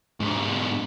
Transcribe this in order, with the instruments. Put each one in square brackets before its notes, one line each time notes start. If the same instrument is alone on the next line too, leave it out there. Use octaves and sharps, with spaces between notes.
[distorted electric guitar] G#2 D3